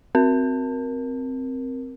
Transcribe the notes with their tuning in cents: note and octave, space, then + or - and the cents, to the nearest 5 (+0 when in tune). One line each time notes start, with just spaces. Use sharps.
C4 +0 A#4 +10